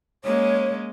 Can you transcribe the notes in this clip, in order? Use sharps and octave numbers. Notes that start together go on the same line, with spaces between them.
G#3 A#3 C#4 C#5